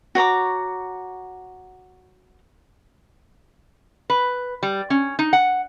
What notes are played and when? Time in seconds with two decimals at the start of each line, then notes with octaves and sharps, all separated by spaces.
0.15 F#4 C#5 A#5 D6
4.10 B4
4.63 G3
4.90 C#4
5.19 D#4
5.33 F#5